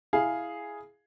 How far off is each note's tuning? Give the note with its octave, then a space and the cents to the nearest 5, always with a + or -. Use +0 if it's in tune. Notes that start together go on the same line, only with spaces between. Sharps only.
E4 +0 G#4 +0 F5 +0